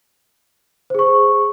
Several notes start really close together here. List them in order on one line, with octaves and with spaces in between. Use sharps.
C5 G#4 C#6